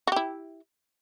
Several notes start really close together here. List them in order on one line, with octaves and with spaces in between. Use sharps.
F#4 G4 E4